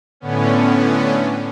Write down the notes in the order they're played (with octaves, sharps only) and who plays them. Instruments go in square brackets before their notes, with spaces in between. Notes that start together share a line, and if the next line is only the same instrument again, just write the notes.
[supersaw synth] A2 D3 B3 C#4